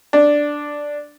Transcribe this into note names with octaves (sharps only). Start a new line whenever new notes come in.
D4